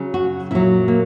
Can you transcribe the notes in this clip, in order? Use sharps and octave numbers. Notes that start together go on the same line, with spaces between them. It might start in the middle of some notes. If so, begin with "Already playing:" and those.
Already playing: C#3 F#3
F#4
A#2 F#3 E4
A#3